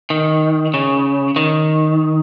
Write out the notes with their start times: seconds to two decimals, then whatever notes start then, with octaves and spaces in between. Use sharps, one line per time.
0.10 D#3
0.74 C#3
1.36 D#3